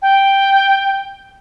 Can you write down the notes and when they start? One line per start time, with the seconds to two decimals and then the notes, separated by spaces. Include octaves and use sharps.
0.01 G5